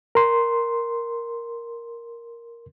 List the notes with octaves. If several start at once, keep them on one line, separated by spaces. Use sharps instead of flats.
A#4 C6